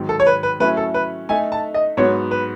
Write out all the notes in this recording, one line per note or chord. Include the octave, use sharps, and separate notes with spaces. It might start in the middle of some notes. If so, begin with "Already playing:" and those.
Already playing: G#2 D#3 F#3
A4
C#5
B4
B4
F#3 A3 C#4 E4 B4
A4
B4
A3 D#4 A4 E5 G#5
A5
D#5
G#2 F#3 B3 F#4 C#5
B4